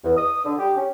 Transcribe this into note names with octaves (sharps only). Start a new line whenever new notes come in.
E2
D#6
D3
G4
C#4